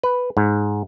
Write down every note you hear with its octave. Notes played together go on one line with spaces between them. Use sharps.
B4
G#2